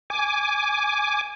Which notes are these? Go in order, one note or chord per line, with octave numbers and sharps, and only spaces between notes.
G#5 D6